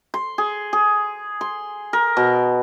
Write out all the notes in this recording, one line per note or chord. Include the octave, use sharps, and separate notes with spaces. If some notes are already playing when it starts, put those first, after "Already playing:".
C6
G#4
G#4
C6
A#4
B2